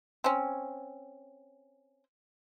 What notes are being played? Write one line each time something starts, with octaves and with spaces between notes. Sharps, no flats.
C4 C#4